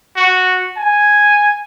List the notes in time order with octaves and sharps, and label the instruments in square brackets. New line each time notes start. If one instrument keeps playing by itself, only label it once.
[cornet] F#4
G#5